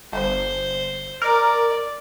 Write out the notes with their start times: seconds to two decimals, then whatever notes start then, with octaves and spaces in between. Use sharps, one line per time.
0.12 G1 C5
1.22 A#4 D5